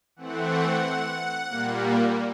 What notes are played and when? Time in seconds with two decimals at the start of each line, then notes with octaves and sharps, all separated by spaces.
0.16 E3 A3 C4 F#5
1.48 A#2 G3 A#3